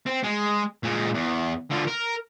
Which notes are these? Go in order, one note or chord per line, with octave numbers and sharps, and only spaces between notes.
C4
G#3
A#2 G#3
E2
D3 F4
A#4